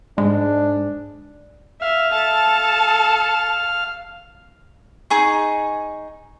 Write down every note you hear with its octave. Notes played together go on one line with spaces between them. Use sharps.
G#2 G#3 D4
E5 F5
A4 A5
D#4 G#4 C#6